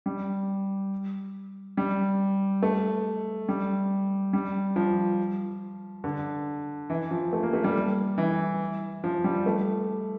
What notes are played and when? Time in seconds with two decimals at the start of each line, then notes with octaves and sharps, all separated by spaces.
0.06 G3
1.77 G3
2.63 A3
3.49 G3
4.33 G3
4.76 F3
6.04 D3
6.90 E3
7.11 F3
7.33 A3
7.43 A#3
7.53 A3
7.64 G3
8.18 E3
9.04 F3
9.24 G3
9.46 A3